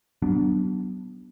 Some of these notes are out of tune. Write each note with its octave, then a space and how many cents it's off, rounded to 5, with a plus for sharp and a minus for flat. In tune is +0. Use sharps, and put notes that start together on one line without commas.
F#3 +35 B3 +0 D4 +0